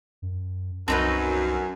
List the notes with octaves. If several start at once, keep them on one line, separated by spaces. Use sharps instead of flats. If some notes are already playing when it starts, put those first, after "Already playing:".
F#2
C2 F#2 C4 D#4 B4 A5 A#6